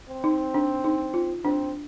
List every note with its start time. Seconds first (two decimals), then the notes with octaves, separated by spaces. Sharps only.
0.09 C4
0.24 D#4
0.54 D4
0.84 D#4
1.14 F4
1.45 C4 D4